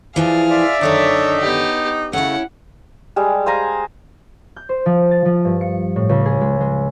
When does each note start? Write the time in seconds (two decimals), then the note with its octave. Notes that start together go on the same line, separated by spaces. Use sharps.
0.16 E3 F3 E4 G#4 D5 F5
0.50 F4 D5 E5
0.81 F#2 D3 D#3 D4 D#4 C#5
1.40 B3 G4
2.13 C#3 A3 C#4 E4 F#5
3.16 G3 G#3
3.46 C5 F5 G#5 A#5
4.56 G6
4.69 C5
4.86 F3
5.11 A6
5.25 F3
5.45 G2
5.61 C#7
5.96 A2
6.09 C#2
6.26 G#4
6.41 G#3
6.61 G#3